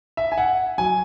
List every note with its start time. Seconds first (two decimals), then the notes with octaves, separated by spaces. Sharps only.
0.17 E5
0.32 G#5
0.38 F#5
0.78 F#3 G#5